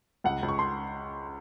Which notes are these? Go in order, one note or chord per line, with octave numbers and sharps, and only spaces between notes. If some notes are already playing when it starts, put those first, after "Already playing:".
C#2 F#5
C#2
C#6
C6